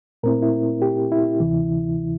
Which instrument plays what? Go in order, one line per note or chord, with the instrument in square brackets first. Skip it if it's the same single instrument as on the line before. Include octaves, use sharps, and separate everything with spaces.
[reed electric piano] A#2 A3 C4 E4 A#4
E4
G4
E4
D2 C3 E3